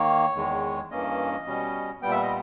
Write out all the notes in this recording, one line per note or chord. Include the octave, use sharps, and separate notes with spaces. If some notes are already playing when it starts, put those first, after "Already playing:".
Already playing: D#3 A#3 C#5
E2 D#3 G#3
G2 E3 A#3 C#4 D#5
B2 G3 C#4
A#2 G3 B3 G5
E5
D#5